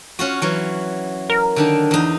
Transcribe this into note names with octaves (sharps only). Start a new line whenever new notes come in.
C#4 F4 F#4
E3 F#3 C#4
A#4
D3 D#3 D4
E2 D#4